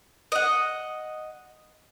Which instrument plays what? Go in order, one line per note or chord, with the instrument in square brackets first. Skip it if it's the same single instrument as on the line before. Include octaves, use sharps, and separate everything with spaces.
[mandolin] D#5 F#5